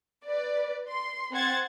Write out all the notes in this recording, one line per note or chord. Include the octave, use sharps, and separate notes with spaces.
B4 D5
C6
C4 C5 F#5 G#6 A6